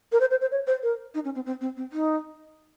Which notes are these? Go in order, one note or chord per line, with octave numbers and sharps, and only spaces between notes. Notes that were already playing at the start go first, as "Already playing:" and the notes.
A#4
C5
C5
C5
C#5
C5
A#4
D#4
C#4
C4
C4
C4
C4
D#4